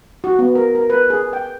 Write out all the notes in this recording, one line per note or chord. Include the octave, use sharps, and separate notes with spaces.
F#4
B3
A#4
A#4
B4
G#4
G5